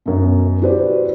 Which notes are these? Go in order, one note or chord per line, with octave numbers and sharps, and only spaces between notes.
F#2 B2
E4 F#4 G4 B4 C5 D5